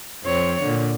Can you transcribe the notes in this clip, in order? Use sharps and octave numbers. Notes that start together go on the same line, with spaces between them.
F2 C4 C#5
A#2 D3